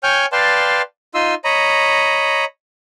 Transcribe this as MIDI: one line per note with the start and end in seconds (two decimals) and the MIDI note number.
0.03 0.26 73
0.03 0.26 79
0.03 0.26 80
0.03 0.26 89
0.03 0.26 91
0.32 0.82 71
0.32 0.82 74
0.32 0.82 77
0.32 0.82 79
0.32 0.82 81
0.32 0.82 84
1.14 1.34 63
1.14 1.34 65
1.14 1.34 75
1.14 1.34 84
1.14 1.34 88
1.44 2.45 73
1.44 2.45 75
1.44 2.45 82
1.44 2.45 83